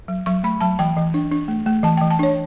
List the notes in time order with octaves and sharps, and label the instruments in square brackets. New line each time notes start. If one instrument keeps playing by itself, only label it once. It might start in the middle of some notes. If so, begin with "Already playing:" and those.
[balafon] F#3
F#3 C#6
A3 B5
F#3 A5
E3 G5
E3
D4
D4
A3
A3
E3 A5
G5
E3
A5
D4 C#5